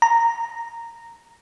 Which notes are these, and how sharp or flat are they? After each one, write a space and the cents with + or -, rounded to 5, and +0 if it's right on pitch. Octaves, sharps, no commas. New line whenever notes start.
A#5 -10